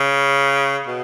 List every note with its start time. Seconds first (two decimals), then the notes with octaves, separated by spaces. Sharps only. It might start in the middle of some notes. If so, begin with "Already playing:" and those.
Already playing: C#3
0.87 B2